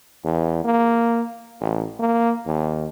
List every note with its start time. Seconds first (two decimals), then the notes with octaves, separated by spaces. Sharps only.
0.25 E2
0.64 A#3
1.61 A1
1.99 A#3
2.46 D#2